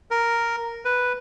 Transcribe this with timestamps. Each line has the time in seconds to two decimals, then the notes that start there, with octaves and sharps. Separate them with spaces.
0.11 A#4
0.85 B4